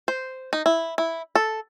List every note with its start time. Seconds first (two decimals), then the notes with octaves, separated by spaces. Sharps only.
0.08 C5
0.53 D#4
0.66 E4
0.98 E4
1.35 A4